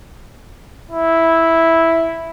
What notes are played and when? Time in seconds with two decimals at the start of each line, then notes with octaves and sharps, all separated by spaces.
0.91 E4